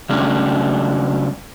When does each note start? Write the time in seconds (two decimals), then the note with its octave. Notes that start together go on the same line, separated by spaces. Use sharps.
0.09 C#3 F#3 G3 A3 C#4 D4